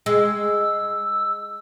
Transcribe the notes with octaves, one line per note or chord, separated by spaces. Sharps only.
G#3 E6